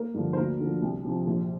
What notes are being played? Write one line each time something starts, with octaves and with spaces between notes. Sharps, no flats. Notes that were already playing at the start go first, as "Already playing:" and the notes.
Already playing: A#3 A#4
G2 D3 F3
C5
D2 A#3 A#4
D3 F3
C2
C3 F3
A#1